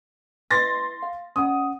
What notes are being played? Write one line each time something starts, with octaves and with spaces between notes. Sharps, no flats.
E4 B4 C6 A6 A#6
F5
C#4 F#5 D#6